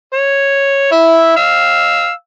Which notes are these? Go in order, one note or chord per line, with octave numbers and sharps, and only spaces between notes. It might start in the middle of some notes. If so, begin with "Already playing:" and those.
C#5
E4 E5
F5 E6